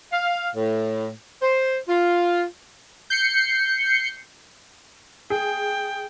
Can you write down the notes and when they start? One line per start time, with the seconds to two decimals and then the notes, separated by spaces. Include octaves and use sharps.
0.12 F5
0.55 A2
1.42 C5
1.88 F4
3.10 G6 C7 C#7
5.30 G#4 G5